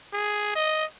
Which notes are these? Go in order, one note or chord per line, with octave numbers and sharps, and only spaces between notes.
G#4
D#5